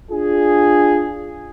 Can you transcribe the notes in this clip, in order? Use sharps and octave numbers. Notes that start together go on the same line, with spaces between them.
D4 F4 G#4